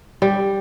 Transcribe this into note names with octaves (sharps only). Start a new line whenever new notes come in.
G3